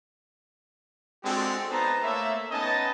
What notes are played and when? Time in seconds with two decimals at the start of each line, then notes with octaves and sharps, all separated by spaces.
1.24 G#3 C4 D4 F#4 G4 A4
1.70 B3 D#4 B4 C5 A5 A#5
2.03 A3 A#3 C#5 E5
2.50 B3 C#4 D#4 D#5 G#5 A5